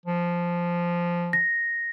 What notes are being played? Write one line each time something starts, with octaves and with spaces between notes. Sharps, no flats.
F3
A#6